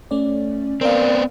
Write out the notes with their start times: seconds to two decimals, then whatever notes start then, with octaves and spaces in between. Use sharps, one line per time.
0.11 A3 C#4 D5
0.81 B3 C4 A#4 D5 F5